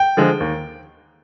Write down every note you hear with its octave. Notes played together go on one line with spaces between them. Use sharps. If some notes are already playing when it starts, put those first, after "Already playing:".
Already playing: G5
D3 F3 G#3
D#2